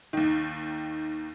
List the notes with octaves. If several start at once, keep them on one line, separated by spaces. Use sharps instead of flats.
D#2 D#3